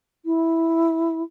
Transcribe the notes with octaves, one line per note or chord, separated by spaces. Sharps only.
E4